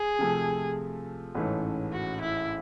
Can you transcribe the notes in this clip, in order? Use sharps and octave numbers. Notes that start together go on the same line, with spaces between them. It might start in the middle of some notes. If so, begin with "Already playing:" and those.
Already playing: G#4
C3 F3 A3
A1 G#2 E3 A3 C#4
F#4
E4